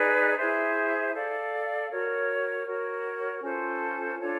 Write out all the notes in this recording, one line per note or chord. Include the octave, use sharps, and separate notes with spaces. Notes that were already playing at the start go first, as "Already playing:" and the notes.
Already playing: D#4 G#4 B4 D5
E4 G#4 C5 E5
A4 D5 F5
F#4 A#4 C#5
F#4 A#4 C#5
C#4 F4 A4 C5
D4 F4 A4 C#5